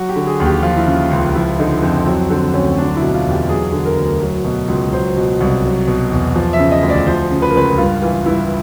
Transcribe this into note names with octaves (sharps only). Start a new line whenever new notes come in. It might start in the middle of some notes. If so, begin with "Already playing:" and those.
Already playing: F#3 F#4
G4
D3
G#4
D#2
G4
F3 F4
E4
C#3 F4
C#2
F3 E4
D3 D#4
F2 C4
F#3 C4
D3 C4
D2 C#4
F#3 D4
E4
B2
F4
E2
G4
F#3 G#4
D3
A#4
D2
F#3
B2
C#2
F#3 C5
B2
C2
F#3
B2
E2
F3
E5
C#3
D#5
D2
D5
F3 C5
C#3
B4
A#4
C#2 B4
G2 F4
E3 F4
G2 E4